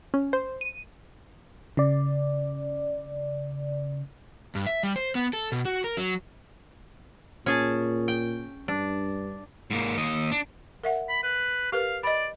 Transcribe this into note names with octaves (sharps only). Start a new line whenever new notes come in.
C#4
C5
D#7
C#3 D5
G2
E5
G3
C5
B3
A4
B2
F#4
A#4
F#3
A#2 C#4 G#4 A5
G5
G2 D4
G#2 A#3
D#2 D#5
D4
A#4 E5 F#5
B5
B4
G4 A#4 B4 F5
D5 D#5 B5